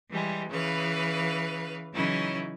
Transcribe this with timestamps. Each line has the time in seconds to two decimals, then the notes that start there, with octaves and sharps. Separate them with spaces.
0.11 E3 G3 G#3
0.51 C#3 E3 B4 F5
1.93 C#3 E3 F#3 C#4 D#4 E4